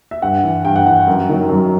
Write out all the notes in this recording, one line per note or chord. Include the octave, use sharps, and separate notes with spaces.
E5
G2 F#5
E3
G2 G5
F#5
E3 F#5
F#2
D#3 F#3
F#2